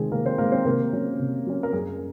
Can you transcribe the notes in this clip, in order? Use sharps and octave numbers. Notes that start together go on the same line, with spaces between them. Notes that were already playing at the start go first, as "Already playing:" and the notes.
Already playing: C3 D#3 G#3 C4 G#4
C3 A#3 A#4
C4 C5
D#3 G#3 A#3 C4 A#4
C4 C5
C3 A#3 A#4
F#3 C#4
C3
F#3 C#4
A#4
F#2 G#4